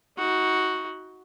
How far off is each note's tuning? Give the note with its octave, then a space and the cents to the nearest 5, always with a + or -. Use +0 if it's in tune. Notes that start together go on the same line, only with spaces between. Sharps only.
D#4 +35 F#4 +0